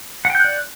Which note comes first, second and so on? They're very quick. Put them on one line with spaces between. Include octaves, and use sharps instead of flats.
F#5 G5 G6 F#6 D5